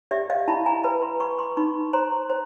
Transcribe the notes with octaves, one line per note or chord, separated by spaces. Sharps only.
G4 D5 E5
D#5 F5
E4 A5 B5
G#5 A#5
B4 A5 B5
A#5 C6
B4 B5 C#6
C6 D6
D#4 B5 C#6
C5 A#5 C6
C5